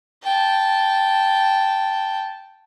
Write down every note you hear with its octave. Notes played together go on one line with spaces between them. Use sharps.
G5 A5